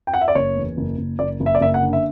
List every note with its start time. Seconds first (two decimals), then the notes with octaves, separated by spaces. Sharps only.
0.07 G5
0.14 F#5
0.21 E5
0.28 D5
0.35 F#1 C#5
0.56 E2
0.77 F#1
0.97 F#1
1.19 F#1 D5
1.40 F#1
1.46 E5
1.55 D5
1.61 F#1 E5
1.74 F#5
1.81 D3
1.93 E5